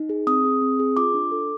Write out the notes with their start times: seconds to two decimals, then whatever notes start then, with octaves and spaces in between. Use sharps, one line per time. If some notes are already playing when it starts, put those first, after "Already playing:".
Already playing: D#4
0.09 G#4
0.27 C4 D#6
0.45 G#4
0.61 C4
0.79 G#4
0.97 F4 D6
1.14 D4
1.31 A4